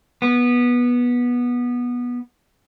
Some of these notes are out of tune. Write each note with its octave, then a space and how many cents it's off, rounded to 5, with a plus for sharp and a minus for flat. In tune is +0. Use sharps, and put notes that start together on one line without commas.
B3 -15